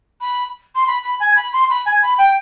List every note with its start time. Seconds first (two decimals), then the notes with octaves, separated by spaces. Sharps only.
0.21 B5
0.75 C6
0.87 B5
1.03 B5
1.20 G#5
1.36 B5
1.53 C6
1.70 B5
1.85 G#5
2.02 B5
2.18 G5